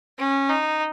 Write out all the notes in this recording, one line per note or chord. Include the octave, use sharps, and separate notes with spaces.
C#4
D#4